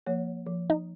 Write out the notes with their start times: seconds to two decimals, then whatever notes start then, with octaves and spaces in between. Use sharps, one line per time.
0.06 F3 A#3 C#5
0.46 F3
0.70 D#4